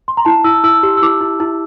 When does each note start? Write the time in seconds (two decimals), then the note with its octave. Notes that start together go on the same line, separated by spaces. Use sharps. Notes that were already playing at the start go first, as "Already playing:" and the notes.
0.08 C6
0.17 A#5
0.25 E4 A5
0.44 E4 E6
0.64 E4 E6
0.83 G4
0.97 E6
1.02 E4 D6
1.21 E4
1.40 E4